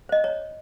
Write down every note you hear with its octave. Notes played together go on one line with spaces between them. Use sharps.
C5 D#5
C#5